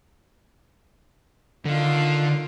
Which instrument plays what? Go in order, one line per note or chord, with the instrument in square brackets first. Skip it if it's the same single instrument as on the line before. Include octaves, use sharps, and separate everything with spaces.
[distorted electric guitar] D3 [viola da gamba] D#3 F4